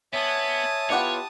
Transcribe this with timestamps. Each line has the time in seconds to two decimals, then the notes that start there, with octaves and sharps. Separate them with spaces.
0.13 B3 C#5 E5 G#5 A5 D#6
0.90 B3 E4 F4 G4 B4 C#5 F#5